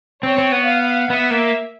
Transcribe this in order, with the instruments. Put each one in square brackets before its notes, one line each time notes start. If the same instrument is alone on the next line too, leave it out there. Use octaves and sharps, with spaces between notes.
[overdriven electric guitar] C4 [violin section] C#5
[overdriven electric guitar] C4
B3
[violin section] F5
[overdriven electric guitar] B3 [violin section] E5
[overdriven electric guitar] A#3